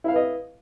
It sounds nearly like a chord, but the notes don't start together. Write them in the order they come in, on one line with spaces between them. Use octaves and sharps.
E4 F5 B4 D#5